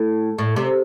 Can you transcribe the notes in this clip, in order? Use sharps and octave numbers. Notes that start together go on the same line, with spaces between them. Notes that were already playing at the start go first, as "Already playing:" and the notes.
Already playing: A2
A2
C3